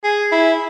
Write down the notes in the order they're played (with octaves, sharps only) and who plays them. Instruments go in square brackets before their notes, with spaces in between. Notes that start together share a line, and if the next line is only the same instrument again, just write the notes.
[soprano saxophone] G#4
E4